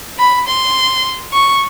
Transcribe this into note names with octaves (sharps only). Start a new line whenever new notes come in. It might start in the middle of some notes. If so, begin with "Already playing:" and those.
B5
C6
C#6